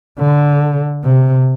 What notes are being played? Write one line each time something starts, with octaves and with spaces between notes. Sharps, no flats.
D3
C3